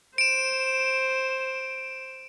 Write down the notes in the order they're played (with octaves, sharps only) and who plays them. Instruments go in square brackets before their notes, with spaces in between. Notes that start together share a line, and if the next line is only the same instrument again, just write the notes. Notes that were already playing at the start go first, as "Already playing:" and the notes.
[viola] C5 [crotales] D7 E7